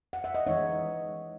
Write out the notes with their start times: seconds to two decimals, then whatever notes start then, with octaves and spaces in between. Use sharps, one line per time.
0.13 F#5
0.24 E5
0.35 D#5
0.47 E3 G#3 D#4 C#5